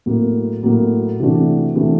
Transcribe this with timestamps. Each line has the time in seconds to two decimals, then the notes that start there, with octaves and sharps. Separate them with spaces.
0.06 A2 F#3 A#3
0.63 A2 F#3 A#3
1.20 C3 E3 A3 D4 F#4
1.76 C3 E3 A3 D4 F#4